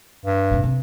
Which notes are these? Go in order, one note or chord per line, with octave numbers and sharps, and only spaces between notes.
G2
G#2 C3
C3